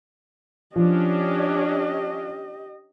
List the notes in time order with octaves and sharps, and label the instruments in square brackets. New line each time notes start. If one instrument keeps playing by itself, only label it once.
[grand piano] F3 [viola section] C#4 D4 [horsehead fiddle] G4 D#5